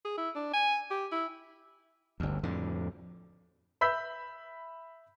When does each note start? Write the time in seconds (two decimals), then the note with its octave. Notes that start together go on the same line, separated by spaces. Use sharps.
0.05 G#4
0.18 E4
0.35 D4
0.54 G#5
0.91 G4
1.12 E4
2.20 G1 D2
2.43 F2 A2 D3
3.81 E5 B5 E6 G6 B6